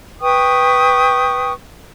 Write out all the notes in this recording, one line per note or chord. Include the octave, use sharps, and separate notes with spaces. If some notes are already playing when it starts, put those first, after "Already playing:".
B4 G5 C#6 D#6